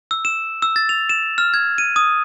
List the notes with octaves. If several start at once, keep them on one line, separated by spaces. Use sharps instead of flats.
E6
E7
E6
A6
F7
E7
F6
G#6
D#7
D#6